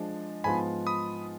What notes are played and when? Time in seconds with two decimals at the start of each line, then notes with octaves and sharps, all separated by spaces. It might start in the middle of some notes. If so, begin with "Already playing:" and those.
Already playing: F3 G#3 D4
0.44 G#2 F3 G#3 B3 F4 G#5 B5
0.87 B5 D#6